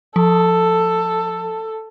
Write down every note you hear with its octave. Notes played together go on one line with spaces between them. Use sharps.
F3 A4